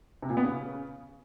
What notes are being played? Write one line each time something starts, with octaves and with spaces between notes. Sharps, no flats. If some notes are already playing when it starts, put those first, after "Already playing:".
C3
A#2
B3
C#3